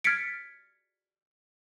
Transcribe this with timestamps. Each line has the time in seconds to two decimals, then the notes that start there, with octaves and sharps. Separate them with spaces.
0.04 F6 G#6 A6 B6 C#7 D7